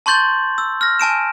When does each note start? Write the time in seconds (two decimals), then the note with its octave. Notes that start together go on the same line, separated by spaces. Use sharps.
0.06 A5 C6 C#6 G6 A6 F#7
0.58 E6
0.81 F6 A#6
0.99 G#5 A5 D7 E7